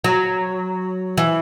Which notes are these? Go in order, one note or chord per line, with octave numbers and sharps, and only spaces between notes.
F#3
E3